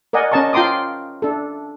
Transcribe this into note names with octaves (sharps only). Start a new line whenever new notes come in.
A#4 D5 D#5 F#5 G#5
C#4 A#4 D#5 A5 A#5 C#6
F4 G5 A#5 C6 D6 D#6
D4 A4